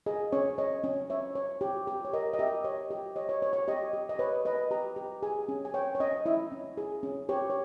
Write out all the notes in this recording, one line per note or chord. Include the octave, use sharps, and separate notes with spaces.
G#4 D#5
C#4 C#5
C#5 D#5
C#4
C#5 E5
C#5
G4 C#5
G4
C#5
A#4 D#5
D#5
G4 E5
C#5 D#5
G4
C#5 D#5
C#5
C#5
C#5
G4 D#5
G4
D#5
B4 C#5
B4 D#5
G4 A#5
G4
G#4 G#5
C#4
G#5
C#5 G5
C#5
C#4 D#5
E4 E5
C#4
G#4
C#4
G4 C#5
C#5